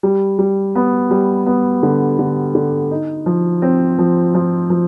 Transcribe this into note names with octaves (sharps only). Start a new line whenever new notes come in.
G3
G3
B3
G3
B3
D3
D3
D3
D#4
F3
C4
F3
F3
F3